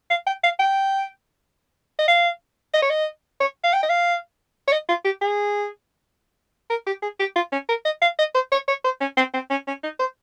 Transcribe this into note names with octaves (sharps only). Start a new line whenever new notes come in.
F5
G5
F5
G5
D#5
F5
D#5
C#5
D#5
C#5
F5
G5
D#5
F5
C#5
D#5
F4
G4
G#4
A#4
G4
G#4
G4
F4
C#4
A#4
D#5
F5
D#5
C5
C#5
C#5
C5
C#4
C4
C4
C#4
C#4
D#4
C5